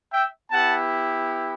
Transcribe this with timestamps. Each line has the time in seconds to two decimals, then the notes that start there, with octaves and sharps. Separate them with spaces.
0.12 E5 G5
0.51 B3 E4 G4 F#5 A5